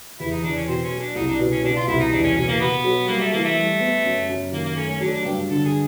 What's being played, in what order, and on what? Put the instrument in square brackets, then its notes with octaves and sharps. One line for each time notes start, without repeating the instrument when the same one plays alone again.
[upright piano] E2 [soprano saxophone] E4
[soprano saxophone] D#4
[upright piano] E2 [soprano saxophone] D4
[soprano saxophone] C#4
[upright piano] B2 [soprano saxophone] C4
[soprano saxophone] C#4
[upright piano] F#3
[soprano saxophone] D4
[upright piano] C2 [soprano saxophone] D#4
[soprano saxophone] D4
[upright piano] B2
[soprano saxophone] C#4
[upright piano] B2 [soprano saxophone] D4
[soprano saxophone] F4
[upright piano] C2 [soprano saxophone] E4
[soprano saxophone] D#4
[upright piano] E2 [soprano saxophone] D4
[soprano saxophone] C#4
[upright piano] B2 [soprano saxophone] C#4
[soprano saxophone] A#3
[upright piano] B2 [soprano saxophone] B3
[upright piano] F#3
[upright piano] G3 [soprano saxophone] A#3
[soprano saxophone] A3
[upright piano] E3 [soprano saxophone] A#3
[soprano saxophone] A3
[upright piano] G3
B3
F#2
F#2
[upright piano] D#3 [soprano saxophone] A#3
[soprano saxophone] A#3
[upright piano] A3 [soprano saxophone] C#4
[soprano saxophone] C#4
[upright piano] F#3 [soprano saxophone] D4
[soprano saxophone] D4
[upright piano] G2 [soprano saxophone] G4
[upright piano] D3 [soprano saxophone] A4
[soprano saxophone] G#4